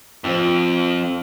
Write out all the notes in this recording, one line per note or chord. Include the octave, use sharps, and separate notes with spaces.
F2 F3 C4 F4 C5